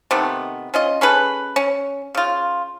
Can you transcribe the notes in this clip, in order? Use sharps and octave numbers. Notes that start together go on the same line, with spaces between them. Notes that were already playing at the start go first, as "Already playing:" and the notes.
C3 D#3 A3 B3
C#4 F4 D#5
C#4 G#4 A4 B4
C#4
C#3 F4